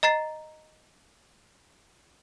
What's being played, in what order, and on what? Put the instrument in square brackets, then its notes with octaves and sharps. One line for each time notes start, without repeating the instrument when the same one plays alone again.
[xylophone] D#5 A#5 A6 C7